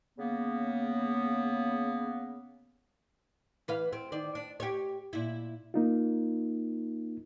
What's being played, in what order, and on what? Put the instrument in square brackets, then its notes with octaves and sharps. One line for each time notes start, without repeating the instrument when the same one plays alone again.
[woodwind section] C#3 A#3 B3
[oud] E3 B4 F5
C4
D#3 D5
D4
G4 C#5
A#2 E4
[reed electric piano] A#3 D#4 F4